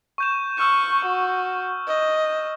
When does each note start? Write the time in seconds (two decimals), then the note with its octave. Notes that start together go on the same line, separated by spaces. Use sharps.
0.18 C#6 G6 E7
0.58 C#6 E6 F6 G6
1.05 F#4
1.87 D#5